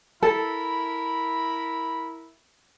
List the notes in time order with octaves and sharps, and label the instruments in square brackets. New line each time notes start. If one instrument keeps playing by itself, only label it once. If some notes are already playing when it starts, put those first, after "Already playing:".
[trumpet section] E4 A#4 B5 [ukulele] A4